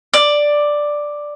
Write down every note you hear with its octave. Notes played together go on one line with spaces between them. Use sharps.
D5